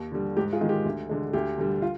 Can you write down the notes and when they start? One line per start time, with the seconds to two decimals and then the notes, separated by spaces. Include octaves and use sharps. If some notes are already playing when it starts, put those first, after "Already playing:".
Already playing: D#2
0.12 D3 G3
0.37 G#2 G4
0.53 F4 G#4
0.61 D#3 G#3
0.69 G4
0.85 D2
1.09 D3 G#3
1.33 D2 G4
1.58 D3 G3
1.82 F4